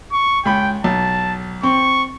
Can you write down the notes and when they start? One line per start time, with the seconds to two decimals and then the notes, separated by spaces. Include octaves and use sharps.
0.12 C#6
0.45 C#2 G5 B5
0.84 B1 A5
1.63 C4 C#6